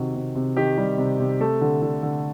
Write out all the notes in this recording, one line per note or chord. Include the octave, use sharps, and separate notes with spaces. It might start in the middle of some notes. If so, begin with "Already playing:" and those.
Already playing: C3 D#3 F#4
C3
C3
D#3 G4
G3
C3
C3
A3 A4
D3
D3
D3